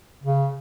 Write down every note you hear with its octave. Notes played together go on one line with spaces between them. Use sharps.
C#3